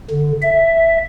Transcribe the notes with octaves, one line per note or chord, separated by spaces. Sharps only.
D3
E5